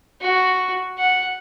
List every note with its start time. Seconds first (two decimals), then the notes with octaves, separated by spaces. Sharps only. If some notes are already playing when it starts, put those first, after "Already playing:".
0.21 F#4
0.98 F#5